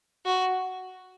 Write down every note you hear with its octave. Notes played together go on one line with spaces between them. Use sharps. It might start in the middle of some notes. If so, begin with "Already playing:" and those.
F#4